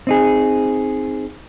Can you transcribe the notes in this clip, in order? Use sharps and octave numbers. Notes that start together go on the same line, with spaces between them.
C4 D#4 G#4